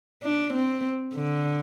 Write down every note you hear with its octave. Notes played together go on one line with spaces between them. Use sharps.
D4
C4
D3